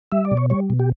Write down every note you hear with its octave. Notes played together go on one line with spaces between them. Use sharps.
G3 E5
D5
B2
C#5
G3 C#5
B2
G4